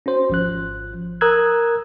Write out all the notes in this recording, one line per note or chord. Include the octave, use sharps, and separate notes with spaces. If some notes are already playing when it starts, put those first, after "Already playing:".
C#4 F#4 C5
G#1 F3 F#6
A#4 A#5 D#6 E6 F#6 G#6